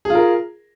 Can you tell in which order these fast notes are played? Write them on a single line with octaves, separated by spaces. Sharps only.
G#4 F4 A#4